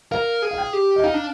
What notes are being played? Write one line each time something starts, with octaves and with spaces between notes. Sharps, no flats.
A#4 F5
G#4
F5
G5
G4
D#5
D#4 F5
D4